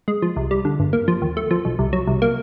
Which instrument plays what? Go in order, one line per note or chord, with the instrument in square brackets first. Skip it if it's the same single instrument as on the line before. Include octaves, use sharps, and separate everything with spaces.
[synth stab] G#3
F3
C2
G3
D3
G1
A#3
F3
D#2
A3
F3
B1
C2
F#3
C2
A#3